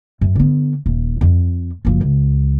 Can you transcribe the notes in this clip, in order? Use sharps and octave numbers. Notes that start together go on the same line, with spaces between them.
F#2
D3 B3
D#1
F2
F#1 F3
C#2